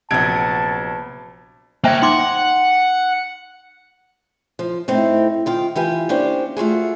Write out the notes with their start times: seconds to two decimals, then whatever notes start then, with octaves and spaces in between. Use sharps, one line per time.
0.11 A#1 C3 F#3 B3 A5 G#6 D7
1.84 A#3 C5 C#5 E5 G5
2.02 D#4 F#5 C6 D6
4.59 F3
4.88 A2 A3 C4 D#4
5.46 D#3 F4 G5
5.76 E3 F4 G4 G#5
6.09 A#3 C#4 D4 G4 C5
6.57 A3 F4 F#4 G#4